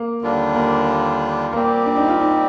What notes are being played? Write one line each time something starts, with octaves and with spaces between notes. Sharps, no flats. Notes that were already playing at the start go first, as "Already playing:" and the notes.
Already playing: A#3
D#2 D3 G3 D4 F4
A#3
A#2 G3 A#3 C4 G4
D4
D#4
F4
D#4